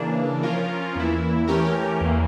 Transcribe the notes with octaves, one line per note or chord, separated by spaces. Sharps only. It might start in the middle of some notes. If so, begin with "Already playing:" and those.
Already playing: C#3 E3 A#3 D4
F3 C#4 F4 A#4
E2 E3 A#3 E4
E3 A3 C#4 G4 A#4
E2 E3 A#3